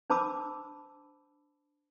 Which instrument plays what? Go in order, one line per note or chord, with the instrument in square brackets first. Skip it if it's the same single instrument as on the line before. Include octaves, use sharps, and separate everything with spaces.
[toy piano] D4 C5 A5 B5 D6 E6